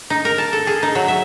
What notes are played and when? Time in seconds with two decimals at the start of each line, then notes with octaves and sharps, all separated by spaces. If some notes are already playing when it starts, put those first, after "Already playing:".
0.10 D#4
0.25 A#4
0.38 A5
0.53 A4
0.67 G#4
0.83 D#4
0.95 F#3
1.08 E5